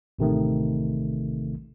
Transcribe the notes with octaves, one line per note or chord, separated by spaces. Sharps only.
A1 C3 D#3 A3